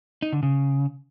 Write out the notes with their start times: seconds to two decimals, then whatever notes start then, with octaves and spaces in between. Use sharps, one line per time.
0.22 D#4
0.33 D3
0.43 C#3